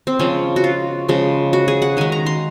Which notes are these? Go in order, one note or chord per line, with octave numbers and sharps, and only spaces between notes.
C4
C#3 F3 G#3 C#4
F#4
F4
C#3 F3 G#3
F#4
G#4
F#5
D#3 G#3 G#5
A#5
C6